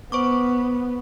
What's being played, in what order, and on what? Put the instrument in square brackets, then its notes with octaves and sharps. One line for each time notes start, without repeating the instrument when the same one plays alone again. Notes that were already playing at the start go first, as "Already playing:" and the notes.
[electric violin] B3 [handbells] C5 C#6 D6